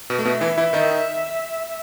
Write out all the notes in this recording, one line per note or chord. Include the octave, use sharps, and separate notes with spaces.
B2 B3
A3
B2 B3 E5
E3 E4
E3 E4
D#3 D#4